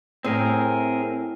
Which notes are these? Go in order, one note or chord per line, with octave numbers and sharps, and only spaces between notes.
A2 C4 G#4 A#4